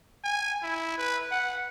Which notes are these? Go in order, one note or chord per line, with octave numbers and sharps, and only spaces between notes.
G#5
E4
B4
F#5